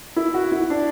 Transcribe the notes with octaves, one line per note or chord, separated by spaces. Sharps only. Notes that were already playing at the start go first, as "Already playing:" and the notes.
E4
F#4
E4
D4